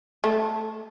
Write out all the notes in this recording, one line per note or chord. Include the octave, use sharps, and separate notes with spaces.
A3